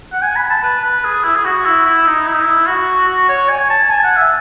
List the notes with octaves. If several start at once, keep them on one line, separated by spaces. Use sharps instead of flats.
F#5
G#5
B5
A5
B4
B4
G#4
E4
G#4
F#4
E4
E4
D#4
E4
D#4
E4
F#4
F#4
C#5
G#5
A5
G#5
F#5
E5